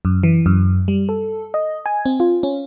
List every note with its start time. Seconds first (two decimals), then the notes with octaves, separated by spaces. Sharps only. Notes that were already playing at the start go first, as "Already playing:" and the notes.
0.05 F#2
0.23 E3
0.46 F#2
0.88 G3
1.09 A4
1.54 D#5
1.86 G#5
2.06 C4
2.20 F4
2.43 C#4